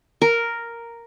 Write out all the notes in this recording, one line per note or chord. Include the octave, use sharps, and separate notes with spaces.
A#4